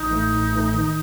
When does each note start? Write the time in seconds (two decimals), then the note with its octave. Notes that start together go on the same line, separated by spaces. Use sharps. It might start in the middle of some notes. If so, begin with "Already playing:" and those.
Already playing: A1 D#4
0.11 A2 E3 A3
0.32 A1
0.53 A2 E3 A3
0.74 D#3